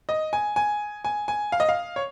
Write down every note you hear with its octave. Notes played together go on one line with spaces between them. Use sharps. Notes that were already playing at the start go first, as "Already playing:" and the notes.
D#5
G#5
G#5
G#5
G#5
F5
D#5
F5
C#5